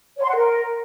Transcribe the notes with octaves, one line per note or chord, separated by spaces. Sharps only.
C#5
C6
F#5
A#4